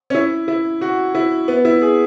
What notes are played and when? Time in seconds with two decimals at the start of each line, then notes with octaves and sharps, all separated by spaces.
0.10 C#4
0.14 E4
0.48 E4
0.81 F#4
1.15 E4
1.48 B3
1.65 E4
1.81 G#4